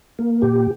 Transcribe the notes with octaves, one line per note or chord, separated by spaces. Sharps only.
A#3
A#2 G4